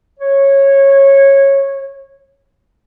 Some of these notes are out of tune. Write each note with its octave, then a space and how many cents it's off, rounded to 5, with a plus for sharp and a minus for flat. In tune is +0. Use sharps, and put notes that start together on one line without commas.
C#5 -15